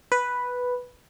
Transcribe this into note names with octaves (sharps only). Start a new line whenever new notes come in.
B4